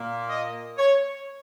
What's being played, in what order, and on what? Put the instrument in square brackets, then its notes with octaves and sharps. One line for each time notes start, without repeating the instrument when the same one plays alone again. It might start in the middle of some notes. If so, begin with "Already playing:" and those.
Already playing: [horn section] A#2 A#3
D#5
C#5